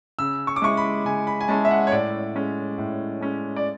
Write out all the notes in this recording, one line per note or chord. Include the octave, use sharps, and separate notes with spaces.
C#3 E6
C#6
D6
G#3 C#4 E4 C#6
B5
C#3 G#5
B5
G#5
G#3 C#4 E4 A5
E5
F#5
C#5
A2 D5
G#3 C#4
A2
G#3 C#4
D5